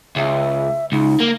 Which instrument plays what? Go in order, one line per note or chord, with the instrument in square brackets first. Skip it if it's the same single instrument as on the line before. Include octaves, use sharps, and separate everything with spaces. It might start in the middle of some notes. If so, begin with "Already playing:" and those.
[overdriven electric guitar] C#2 [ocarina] E5
[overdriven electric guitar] C#2 [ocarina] D#4
[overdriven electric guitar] A#3